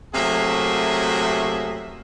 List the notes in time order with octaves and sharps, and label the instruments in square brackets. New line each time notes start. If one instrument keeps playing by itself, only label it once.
[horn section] C3 F#3 A3 A#3 G#4 E5